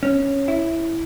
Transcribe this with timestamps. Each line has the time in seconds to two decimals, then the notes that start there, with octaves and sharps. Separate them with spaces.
0.03 C#4
0.48 E4